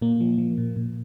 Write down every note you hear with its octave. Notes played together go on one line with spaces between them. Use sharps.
A#2 A#3
F3
F3
A#2
A#2